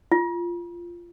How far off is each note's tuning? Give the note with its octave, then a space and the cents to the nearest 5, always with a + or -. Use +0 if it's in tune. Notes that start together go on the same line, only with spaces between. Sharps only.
F4 -15